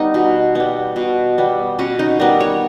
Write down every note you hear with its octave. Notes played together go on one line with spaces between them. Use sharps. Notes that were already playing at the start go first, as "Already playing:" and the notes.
Already playing: G3 B3 D#4
B2
G3 B3
B2
G3 B3
B2 C#4
D#4
G3 B3 A#4
C#5